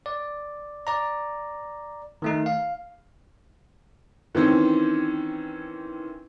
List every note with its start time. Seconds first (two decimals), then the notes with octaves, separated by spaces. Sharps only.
0.06 D5
0.87 D5 A#5
2.22 D#3 A3 D#4
2.46 F5
4.35 D#3 E3 C4 C#4